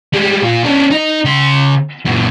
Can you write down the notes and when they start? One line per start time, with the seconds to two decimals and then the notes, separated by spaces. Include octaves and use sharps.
0.14 G3 G#3
0.43 A#2 F4
0.64 C#4 D4
0.90 D#4 D#5
1.25 C#3 C6
2.06 F#2 A#2